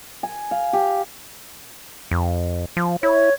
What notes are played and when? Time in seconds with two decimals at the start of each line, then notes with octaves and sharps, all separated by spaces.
0.23 G#5
0.51 F5
0.73 G4
2.11 F2
2.77 F3
3.03 E4 C#5